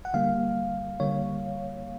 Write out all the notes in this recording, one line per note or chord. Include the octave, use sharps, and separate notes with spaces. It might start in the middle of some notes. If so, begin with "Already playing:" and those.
F#5
D3 G3 A#3 F5
D3 G3 A#3 C#5